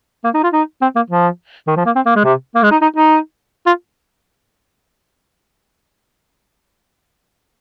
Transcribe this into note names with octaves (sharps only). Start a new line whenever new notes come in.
A#3
D#4
F4
D#4
C4
A#3
F3
D#3
F3
A#3
C4
A#3
G#3
C3
A#3
G#3
D#4
D#4
D#4
F4